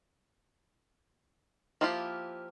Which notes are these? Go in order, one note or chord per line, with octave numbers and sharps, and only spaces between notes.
F3 A#3 E4 F4 G4